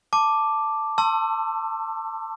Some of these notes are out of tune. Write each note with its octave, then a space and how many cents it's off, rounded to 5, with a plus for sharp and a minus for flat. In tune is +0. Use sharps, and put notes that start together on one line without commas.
A5 +5 D6 +0
A5 +30 C6 +40 E6 +20